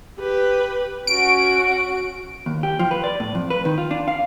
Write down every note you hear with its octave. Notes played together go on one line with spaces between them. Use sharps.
G4 B4
C#4 F#4 D7
D#2
G4
F3
B4
D5
A2
F2
B4
D#3
F4
D4
F5